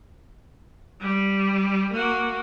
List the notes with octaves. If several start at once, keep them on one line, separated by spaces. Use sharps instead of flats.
G3
A#3 F#4